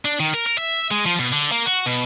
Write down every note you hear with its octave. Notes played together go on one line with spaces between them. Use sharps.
D4
D#3
A#4
A#4
E5
G#3
F3
B2
D3
A#3
F#4
B2